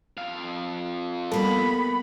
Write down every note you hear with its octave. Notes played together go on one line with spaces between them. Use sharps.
F2 F5
G3 A#3 B3 F#4 A4 B5